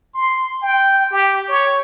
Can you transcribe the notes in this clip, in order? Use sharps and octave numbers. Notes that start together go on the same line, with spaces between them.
C6
G5
G4
C#5